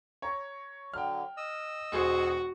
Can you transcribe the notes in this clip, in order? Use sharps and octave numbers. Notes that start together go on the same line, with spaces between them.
C#5 A#5 C#6
D3 F#3 G5 F6
D#5 E6
E1 F#4 G#4 C5